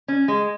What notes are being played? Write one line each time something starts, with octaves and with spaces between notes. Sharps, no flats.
C#4
G#3